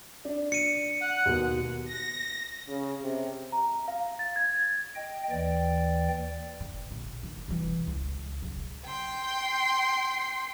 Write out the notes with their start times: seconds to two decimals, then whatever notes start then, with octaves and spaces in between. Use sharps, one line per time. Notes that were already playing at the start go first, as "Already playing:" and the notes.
0.25 D4
0.52 C#7 D#7
1.01 F#5
1.25 D#2 B2
1.85 A#6
2.68 C#3
3.01 C3
3.52 A#5
3.88 F5
4.19 A6
4.36 G#6
4.95 D#5 G5
5.31 D#2 E3 D5 G5
6.60 D3
6.91 A#1
7.23 D#3
7.48 C2 E3
7.87 C#2
8.42 C#3 F#3
8.86 G5 C6